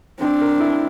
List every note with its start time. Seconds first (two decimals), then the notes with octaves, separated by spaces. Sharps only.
0.21 C4 D4
0.41 A#4
0.60 E4